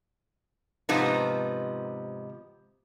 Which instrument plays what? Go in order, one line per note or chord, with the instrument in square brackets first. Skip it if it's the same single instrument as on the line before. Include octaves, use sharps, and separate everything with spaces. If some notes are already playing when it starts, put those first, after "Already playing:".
[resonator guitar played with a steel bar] G#2 C3 F3 B3 D#4